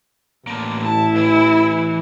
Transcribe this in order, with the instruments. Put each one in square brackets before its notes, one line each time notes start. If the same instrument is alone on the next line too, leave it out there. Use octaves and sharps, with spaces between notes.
[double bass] A1 [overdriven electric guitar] D3 A#3
[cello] E4 [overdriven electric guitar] A5
[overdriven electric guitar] E3